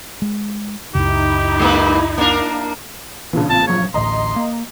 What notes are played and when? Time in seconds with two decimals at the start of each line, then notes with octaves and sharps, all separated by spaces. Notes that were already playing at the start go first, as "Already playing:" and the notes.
0.22 G#3
0.95 C#2 F#2 C#3 D#4 E4 G4
1.60 G#3 A#3 B4
2.18 A#3 D4 A#4
3.33 A#2 C#3 E3 D4
3.50 A1 C4 A5
3.68 G2 F3 F#3 C#5
3.94 A1 D2 A2 D#5 A#5 C6
4.36 A#3